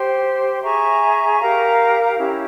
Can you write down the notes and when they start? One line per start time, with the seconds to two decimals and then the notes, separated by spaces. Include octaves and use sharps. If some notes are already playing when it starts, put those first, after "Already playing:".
Already playing: G4 C5 G5 C6
0.62 G#4 E5 A#5 C#6
1.38 G4 A#4 F5 A#5
2.16 C#4 E4 G4